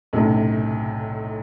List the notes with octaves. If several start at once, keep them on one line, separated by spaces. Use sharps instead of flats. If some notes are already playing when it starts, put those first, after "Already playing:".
B1 F#2 A2 C3